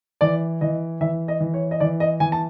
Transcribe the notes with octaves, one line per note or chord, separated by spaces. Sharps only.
E3 D5
E3 D#5
E3 E5
D#5
E3
C#5
D#5
E3 D5
D#5
E3 G#5
A5